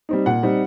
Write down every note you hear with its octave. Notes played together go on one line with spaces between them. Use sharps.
G3 C4 D#4
A#2 F#5
G3 C4 D#4